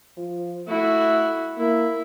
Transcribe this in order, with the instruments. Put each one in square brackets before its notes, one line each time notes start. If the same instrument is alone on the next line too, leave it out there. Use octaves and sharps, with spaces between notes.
[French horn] F3
[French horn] A3 [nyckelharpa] E4 F#4
[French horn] A#3 [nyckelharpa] E4